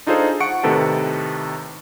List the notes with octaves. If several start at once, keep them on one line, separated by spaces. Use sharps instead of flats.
D4 D#4 F4 G#4 A4 C5
F#5 C#6 C#7 D7
A2 C3 D#3 A4 B4 A5